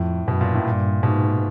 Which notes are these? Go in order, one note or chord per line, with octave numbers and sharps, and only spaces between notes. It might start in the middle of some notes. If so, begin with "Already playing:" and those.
Already playing: F2 A2
F#2 B2
A#2
A2
G2 A#2
G#2 B2